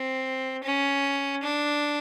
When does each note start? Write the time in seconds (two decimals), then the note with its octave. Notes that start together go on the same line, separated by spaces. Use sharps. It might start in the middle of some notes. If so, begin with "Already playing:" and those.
Already playing: C4
0.64 C#4
1.43 D4